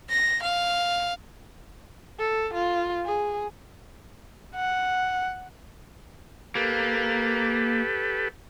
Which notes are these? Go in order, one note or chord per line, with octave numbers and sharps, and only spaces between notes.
A#6
F5
A4
F4
G#4
F#5
A#3 G4 A4 B4